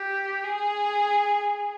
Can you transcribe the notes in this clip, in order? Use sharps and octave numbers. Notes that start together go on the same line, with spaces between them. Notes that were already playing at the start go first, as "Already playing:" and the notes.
Already playing: G4
G#4